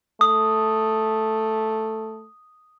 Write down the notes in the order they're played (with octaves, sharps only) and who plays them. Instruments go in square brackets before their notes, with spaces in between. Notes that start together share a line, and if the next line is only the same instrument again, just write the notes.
[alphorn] A3 [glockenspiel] D#6